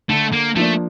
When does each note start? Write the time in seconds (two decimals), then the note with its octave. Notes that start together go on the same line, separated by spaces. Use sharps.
0.09 D3 A3
0.32 A#3
0.56 F3 A3 A#3 D4